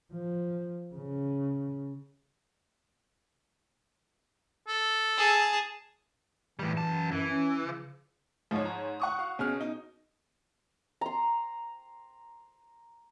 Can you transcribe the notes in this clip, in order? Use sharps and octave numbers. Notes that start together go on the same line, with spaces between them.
F3
C#3
A4
G#4 A5
A2 E3 G3
F#2 A5
F#2 E3
C#4
C#3
G#2 F3 D#4 C#5
A#5
F#5 C#6 D#6
F#4 F5
B2 C#4 G#4 F6
D#4
A#5 C6